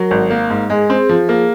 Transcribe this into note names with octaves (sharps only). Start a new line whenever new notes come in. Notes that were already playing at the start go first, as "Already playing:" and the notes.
Already playing: F#3 A#4
G#1
A#3
G#2
G#3 G#4
C4
F3
A#3